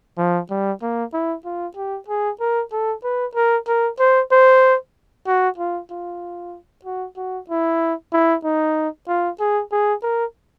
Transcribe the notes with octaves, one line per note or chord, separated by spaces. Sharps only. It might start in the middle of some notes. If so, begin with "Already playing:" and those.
F3
G3
A#3
E4
F4
G4
G#4
A#4
A4
B4
A#4
A#4
C5
C5
F#4
F4
F4
F#4
F#4
E4
E4
D#4
F4
G#4
G#4
A#4